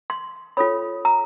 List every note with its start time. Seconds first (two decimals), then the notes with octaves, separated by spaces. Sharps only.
0.10 C6
0.57 F4 A4 C#5 B5
1.05 A#5